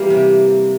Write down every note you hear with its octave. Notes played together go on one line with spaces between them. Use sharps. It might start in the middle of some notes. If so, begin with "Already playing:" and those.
Already playing: E3 G3 A#3
C3